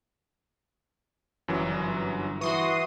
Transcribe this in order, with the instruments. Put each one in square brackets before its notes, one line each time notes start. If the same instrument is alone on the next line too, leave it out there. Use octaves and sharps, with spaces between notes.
[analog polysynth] G1 [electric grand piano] F#2 E3 F#3
[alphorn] E3 [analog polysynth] F#4 C6 D#6 [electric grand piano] C#6